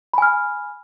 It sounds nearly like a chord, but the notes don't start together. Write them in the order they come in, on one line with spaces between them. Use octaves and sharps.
B5 G#5 F6